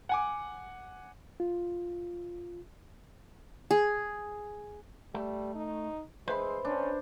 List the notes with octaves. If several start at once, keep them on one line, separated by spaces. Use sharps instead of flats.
F#5 G#5 D6
F4
G#4
G3 A3
D#4
G#3 B4 C5 E5 B5 C6
C#4 D4